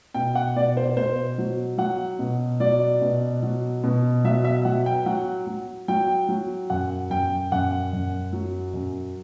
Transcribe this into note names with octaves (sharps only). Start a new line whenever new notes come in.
B2 G5
F#5
B2 D5
C5
B2 C5
F#3
F#3 F#5
B2
F#3 D5
B2
F#3
B2
F#3 E5
E5
F#3 F#5
G5
F#3 F#5
F#3
F#3 G5
F#3
F#2 F#5
F#2 G5
F#2 F#5
F#2
F#3
F#2